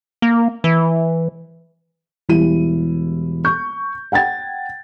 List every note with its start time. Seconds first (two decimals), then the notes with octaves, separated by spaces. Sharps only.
0.22 A#3
0.64 E3
2.29 E1 G3 E4 D#7
3.45 C#6 G6
4.12 F#5 G5 G#6 A6